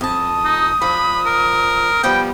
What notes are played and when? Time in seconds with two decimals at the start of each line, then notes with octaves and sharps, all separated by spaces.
0.01 F2 A5 D#6
0.45 D#4
0.81 F3 D4 B5
1.26 A#4
2.03 F3 G3 B3 G5